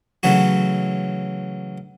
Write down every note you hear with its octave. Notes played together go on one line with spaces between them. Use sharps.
C#3 E3 F#3 A3 F#4